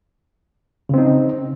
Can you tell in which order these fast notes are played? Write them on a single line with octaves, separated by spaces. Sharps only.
C#3 C4 D#4